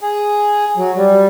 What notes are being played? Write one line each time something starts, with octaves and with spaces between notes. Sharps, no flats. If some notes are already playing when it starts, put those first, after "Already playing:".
G#4
F#3
G3